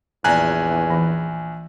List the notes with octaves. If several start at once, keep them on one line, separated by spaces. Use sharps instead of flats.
A#1 E2 D5 G#5 A#5 F#6
E3